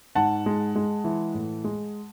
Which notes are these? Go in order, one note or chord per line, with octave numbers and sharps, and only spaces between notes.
G#2 F#5 A5
G#3
G#3
E3
A2
G#3